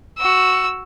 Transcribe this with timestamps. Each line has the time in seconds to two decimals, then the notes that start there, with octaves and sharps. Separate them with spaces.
0.18 F#4 E6